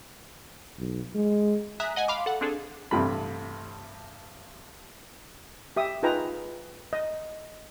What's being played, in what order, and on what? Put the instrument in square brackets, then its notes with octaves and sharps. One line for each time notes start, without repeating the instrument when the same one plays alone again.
[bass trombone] B1
G#3
[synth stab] E5 G#5 A#5 D#6 F#6 B6
D#5 F#5 G#5
F5 B5 C6 D6
A4 F#5
C4 D4 G#4 A4
[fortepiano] A1 G2 C3 A3 B5
[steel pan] G4 E5 D#6
D#4 F4 G#4 B4 G5 A#5
D#5